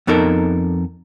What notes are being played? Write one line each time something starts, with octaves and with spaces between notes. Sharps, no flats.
F2 B3 D#4 A4 A#4